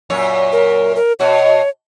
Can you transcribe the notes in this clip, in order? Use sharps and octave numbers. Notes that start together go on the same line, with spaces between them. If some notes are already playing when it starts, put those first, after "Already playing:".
F#2 A#2 C#5
A#4
A#4
B2 F#4 C#5